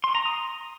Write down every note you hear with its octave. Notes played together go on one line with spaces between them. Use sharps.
C6
A#5
D#6